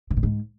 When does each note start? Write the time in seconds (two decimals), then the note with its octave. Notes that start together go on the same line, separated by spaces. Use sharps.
0.11 C3
0.17 A#2
0.23 G#2